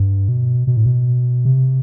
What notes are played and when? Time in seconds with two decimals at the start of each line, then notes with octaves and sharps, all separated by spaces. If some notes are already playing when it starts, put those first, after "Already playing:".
Already playing: G2
0.29 B2
0.67 B2
0.77 A2
0.86 B2
1.45 C3